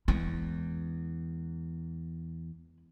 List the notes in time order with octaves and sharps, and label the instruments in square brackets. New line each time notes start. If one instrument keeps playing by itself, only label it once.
[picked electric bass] E2 [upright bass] G#3 E4